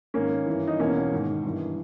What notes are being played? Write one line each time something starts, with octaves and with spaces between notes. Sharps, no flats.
G#2 D#3 A#3 C#4
G2 E3
D#4
E2 B2 A#3 C#4
G#2 D#3
G2 E3